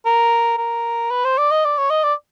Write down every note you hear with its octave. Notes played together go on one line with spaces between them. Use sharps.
A#4
A#4
B4
C5
D5
D#5
D5
C#5
D#5
D5